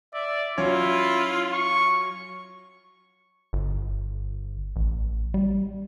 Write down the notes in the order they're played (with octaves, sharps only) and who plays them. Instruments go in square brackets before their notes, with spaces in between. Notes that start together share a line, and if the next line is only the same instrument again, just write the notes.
[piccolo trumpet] D5 [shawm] E5
[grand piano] F#3 C#4 C#5 [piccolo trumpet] E4 [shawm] F4
[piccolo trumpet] C#6
[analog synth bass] G1
A1
G3